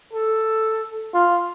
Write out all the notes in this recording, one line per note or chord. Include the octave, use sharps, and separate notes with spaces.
A4
F4